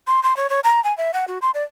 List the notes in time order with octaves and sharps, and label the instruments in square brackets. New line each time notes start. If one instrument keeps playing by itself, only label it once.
[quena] C6
C6
C#5
C#5
A#5
G#5
E5
F#5
F#4
C6
D5